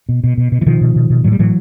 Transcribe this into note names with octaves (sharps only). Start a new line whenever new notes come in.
B2
B2
B2
B2
E3
B2 D#3 F3
B2
B2
B2
A2 F#3
G3
A2 E3 F#3